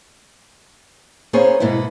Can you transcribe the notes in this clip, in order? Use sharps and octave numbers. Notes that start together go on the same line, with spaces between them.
A#3 B3 C#4 G#4 C5 C#5
G#2 B2 A#3 B3 E4